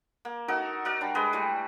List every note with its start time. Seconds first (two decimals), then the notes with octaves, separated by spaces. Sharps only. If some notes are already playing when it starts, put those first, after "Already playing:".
0.25 A#3
0.48 D#4 F#4 A4 A#4
0.85 F#4 A#4 D5
1.01 G3 D4
1.15 G#3 G#4 B4 D#5
1.33 E3 G3 A3 G4